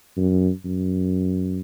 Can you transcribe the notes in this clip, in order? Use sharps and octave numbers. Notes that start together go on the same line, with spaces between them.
F#2
F#2